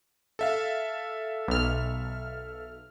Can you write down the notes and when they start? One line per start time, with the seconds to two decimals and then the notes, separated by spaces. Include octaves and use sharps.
0.39 A4 E5 F5
1.48 B1 F6